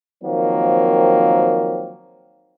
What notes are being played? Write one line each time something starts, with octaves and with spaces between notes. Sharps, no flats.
D#3 F3 F#3 A#3 C4